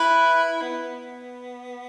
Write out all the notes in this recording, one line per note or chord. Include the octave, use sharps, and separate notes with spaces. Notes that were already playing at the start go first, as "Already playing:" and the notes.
Already playing: E4 B4
B3